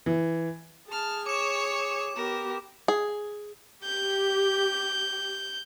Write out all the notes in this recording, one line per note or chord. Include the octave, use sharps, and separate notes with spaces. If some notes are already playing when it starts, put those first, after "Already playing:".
E3
G#4 A5 F6
C#5 C#6 D6 E7
B3 G4 A#4
G#4
G4 G6